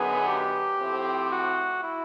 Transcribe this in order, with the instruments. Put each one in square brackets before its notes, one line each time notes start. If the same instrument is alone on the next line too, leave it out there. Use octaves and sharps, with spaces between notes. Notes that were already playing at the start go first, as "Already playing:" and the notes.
Already playing: [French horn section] F#2 D3 F#3 B3 D#4 [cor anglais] G#4
[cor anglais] G4
[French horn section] A2 F3 A3 C4
[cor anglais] F#4
E4